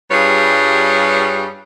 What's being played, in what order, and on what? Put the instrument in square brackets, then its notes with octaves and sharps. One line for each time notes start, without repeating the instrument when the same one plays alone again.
[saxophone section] G2 G3 F4 G#4 B4 C#5